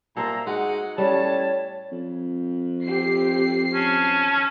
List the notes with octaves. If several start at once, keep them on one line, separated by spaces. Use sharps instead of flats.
A#2 A4 C5 E5 A#5
G#3 D#4 F#4 F#5
A2 G3 C#4 C#5 A5
F2
C4 G4 C7
C#4 A5